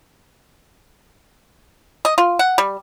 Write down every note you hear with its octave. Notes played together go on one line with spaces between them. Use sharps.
D#5
F4
F#5
G3